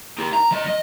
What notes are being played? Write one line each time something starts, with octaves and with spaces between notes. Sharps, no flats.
D#4 G4
A#5
F3 D#5
D#5